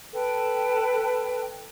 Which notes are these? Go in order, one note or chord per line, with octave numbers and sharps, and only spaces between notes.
A4 B4 G5